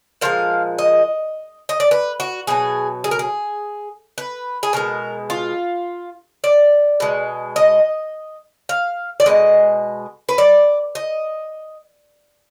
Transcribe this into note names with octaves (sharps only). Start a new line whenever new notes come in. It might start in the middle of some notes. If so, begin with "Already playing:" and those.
A#2 F3 G#3 F5
D#5
D#5
D5
B4
F#4
B2 F#3 G#4
G#4
A#4
G#4
B4
G#4
B2 G#3 A#4
F4
D5
B2 G#3
D#5
F5
D5
B2 G#3 D#5
B4
D5
D#5